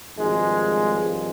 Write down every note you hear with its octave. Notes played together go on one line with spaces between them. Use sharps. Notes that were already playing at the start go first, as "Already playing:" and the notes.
G#1 G2 F3 G#3
G#3